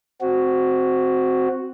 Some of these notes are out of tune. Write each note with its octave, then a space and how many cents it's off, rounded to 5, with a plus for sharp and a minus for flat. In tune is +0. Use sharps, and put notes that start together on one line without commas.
C4 +0 F#4 +0